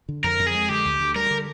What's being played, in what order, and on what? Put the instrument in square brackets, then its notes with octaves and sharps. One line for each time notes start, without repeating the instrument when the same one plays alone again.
[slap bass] D3
[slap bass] F2 [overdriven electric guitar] A#4
[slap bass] F2
[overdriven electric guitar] G#4
[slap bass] G#3
[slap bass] D3 [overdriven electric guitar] G4
[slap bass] D2
D2
[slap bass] G3 [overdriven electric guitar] A#4
[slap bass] D3